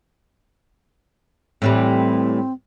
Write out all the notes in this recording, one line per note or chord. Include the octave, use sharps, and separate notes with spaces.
A2 E3 G3 C4